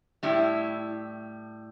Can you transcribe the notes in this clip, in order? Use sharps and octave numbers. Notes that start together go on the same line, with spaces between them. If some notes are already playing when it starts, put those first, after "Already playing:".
A2 G3 E4